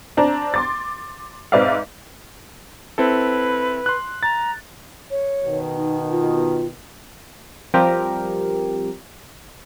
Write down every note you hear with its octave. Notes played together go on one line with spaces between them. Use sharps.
C4 D4 A#5
C6 D6 A6
G#2 C4 B4 D5 E5 F5
C4 E4 A4 B4
C6 F#6
A#5 A6
C#5
B2 D#3
D#4
F4
F3 G3 C4 G4 A#4